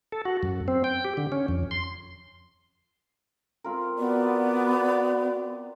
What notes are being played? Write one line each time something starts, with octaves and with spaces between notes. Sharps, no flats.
A4
F#4
F#2
C4
G5
G4
D3
C#4
F2
C6
C4 F4 A#4
B3 F#4 D5